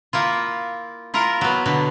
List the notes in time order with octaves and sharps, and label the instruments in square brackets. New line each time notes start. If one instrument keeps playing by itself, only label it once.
[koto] A#3 E4 F4
E4 F4 A#4 A#5
F#3 B3
B2 D3 B3